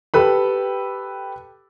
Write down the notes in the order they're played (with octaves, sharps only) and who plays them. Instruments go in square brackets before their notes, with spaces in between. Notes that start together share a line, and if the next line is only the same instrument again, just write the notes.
[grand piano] G4 A4 B4 B5